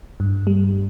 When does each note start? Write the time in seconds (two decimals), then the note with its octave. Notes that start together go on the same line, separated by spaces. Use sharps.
0.20 G2
0.47 G3